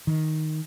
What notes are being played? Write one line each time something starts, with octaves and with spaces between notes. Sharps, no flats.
D#3